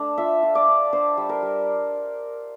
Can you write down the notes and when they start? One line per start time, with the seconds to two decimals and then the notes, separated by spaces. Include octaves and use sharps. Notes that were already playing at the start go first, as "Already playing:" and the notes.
Already playing: A3 D4
0.18 F4 E5
0.43 F4
0.55 D5
0.68 D4
0.93 D4 C5
1.17 G3
1.29 A#4
1.42 G3